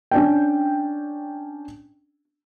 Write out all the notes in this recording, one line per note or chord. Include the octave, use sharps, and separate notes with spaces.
C#4 D4 G5